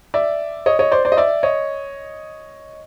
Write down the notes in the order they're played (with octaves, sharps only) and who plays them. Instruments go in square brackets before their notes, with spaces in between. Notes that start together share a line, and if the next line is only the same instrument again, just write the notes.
[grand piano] D5 E5
C#5 D#5
C#5 D#5
C5 D5
C5 D5
D#5
D5 E5
C#5 D#5